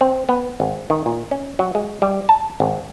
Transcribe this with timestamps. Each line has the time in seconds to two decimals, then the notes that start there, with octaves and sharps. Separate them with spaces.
0.01 C4
0.29 B3
0.60 G#1
0.90 D#3
1.06 A#2
1.31 C#4
1.59 F#3
1.75 G#3
2.02 G3
2.29 A5
2.60 G#1